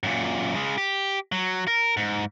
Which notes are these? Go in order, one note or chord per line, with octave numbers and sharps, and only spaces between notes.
F#2 A#2
C#3 G#3
G4
F#3
A#4
G#2